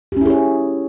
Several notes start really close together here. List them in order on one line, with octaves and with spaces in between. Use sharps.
G4 C#4 E4 G#4 C#5